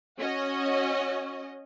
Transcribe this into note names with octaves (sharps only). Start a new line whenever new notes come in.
C#4 F#4 D#5